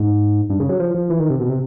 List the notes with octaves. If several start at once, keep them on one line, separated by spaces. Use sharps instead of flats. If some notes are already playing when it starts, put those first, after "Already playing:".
Already playing: G#2
G2
C#3
F#3
F3
F3
E3
D#3
C3
B2
C3